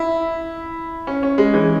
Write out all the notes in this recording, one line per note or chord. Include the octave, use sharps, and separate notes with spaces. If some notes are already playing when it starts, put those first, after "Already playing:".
Already playing: E4
C#4
C#4
G#3
E3